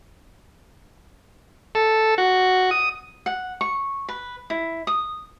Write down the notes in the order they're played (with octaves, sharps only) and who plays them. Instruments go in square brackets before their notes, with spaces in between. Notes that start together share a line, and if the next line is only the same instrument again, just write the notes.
[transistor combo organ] A4
F#4
D#6
[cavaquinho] F#5
C#6
B4
E4
D#6